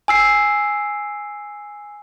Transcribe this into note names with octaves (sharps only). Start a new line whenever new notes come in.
G#5 E6 C7